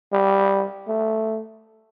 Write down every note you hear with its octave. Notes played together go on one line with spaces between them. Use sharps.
G3
A3